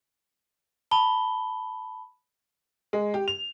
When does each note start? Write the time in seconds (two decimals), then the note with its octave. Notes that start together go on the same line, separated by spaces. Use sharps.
0.91 A5 B5 G7
2.93 G#3
3.14 G4
3.28 F7